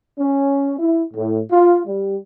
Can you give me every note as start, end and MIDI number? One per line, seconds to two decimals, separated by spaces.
0.19 0.74 61
0.79 1.02 64
1.14 1.41 45
1.51 1.82 65
1.86 2.17 55